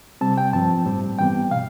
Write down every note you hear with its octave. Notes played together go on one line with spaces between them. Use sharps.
C3 G3 C4 A5
G5
G2 F3 C4 A5
A2 G3 C4
G2 E3 G3 B3 G5
B2 F5